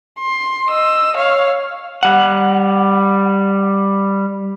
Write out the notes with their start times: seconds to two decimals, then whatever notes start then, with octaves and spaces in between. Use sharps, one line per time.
0.20 C6
0.68 D#5 E6
1.16 C#5 F5
2.03 G3 F#5